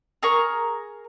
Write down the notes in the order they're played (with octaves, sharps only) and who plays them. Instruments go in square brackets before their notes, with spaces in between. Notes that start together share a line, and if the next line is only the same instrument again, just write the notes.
[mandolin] G#4 A#4 A#5 C#6